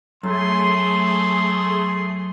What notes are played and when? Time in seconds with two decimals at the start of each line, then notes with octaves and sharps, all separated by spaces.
0.23 F#2 A3 G#4 C6